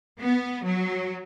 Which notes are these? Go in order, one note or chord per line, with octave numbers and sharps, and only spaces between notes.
B3
F#3